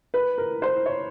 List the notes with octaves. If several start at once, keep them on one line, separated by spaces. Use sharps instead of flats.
B4
A#4
C5
C#5